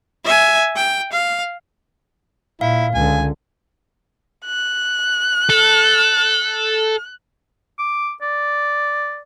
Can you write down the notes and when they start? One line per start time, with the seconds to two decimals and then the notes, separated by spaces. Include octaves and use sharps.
0.24 E5 G#5
0.76 G5
1.12 F5
2.61 A#2 E4 F5
2.95 C#2 D3 G#5
4.45 F#6
5.50 A4
7.79 D6
8.22 D5